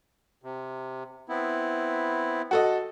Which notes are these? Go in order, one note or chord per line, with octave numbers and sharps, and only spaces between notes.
C3
B3 C4 E4
F#4 A4 D#5